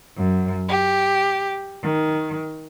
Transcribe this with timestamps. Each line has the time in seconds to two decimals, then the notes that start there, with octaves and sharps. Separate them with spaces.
0.16 F#2
0.68 G4
1.83 D#3